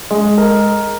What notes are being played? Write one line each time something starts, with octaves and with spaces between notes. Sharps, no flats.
G#3
A#4